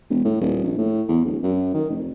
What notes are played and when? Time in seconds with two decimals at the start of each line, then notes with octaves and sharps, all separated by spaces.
0.10 E1
0.25 A2
0.41 D#1
0.64 A#1
0.78 A2
1.09 E2
1.25 D1
1.43 F#2
1.74 D#3
1.90 F1